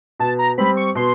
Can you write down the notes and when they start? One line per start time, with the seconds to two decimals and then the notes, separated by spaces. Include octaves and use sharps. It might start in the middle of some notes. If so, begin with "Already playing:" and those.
0.20 B2 A5
0.39 A#5
0.58 G3 C4 B5
0.77 C#6
0.95 B2 C6